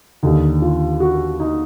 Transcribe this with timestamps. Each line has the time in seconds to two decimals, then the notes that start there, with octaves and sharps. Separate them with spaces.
0.23 D#2 D3 D#4
0.62 F4
1.00 F#4
1.40 D#4